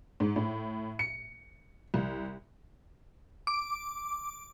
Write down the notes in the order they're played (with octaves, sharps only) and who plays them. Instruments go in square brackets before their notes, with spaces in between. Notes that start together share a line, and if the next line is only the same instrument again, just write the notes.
[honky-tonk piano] G#2
A2
C#7
C2
[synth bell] D6